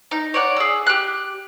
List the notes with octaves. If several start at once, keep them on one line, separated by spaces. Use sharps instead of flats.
D#4
C#5 D5 F#5
G#4 E6
G4 F#6